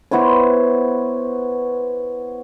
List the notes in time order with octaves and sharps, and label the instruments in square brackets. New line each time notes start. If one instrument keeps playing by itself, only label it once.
[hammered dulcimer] B3 E4 C5 C#5